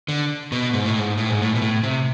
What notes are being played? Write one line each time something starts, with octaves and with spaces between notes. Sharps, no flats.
D3
B2
G#2
A2
G#2
A2
G#2
A2
B2
A2
C3